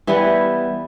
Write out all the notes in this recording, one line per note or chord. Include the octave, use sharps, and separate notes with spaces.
E3 G3 B3 E4